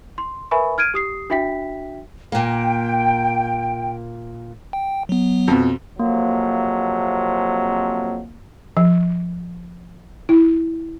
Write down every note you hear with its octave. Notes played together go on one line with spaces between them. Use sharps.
C6
A#4 B4 E5 G#5 B5 C#6
F6 G#6 D7 D#7
G4 D#6 C7
D4 F#4 E5 G5 B6
A#2 A#3 G5
G5
F#3 B3
F2 B2
F2 C3 F#3 A#3
F3
E4